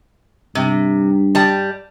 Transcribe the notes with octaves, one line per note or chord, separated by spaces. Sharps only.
G2 C3
G3 A5